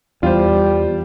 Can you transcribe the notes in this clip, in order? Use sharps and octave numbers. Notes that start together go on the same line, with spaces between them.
E2 G3 F4 C5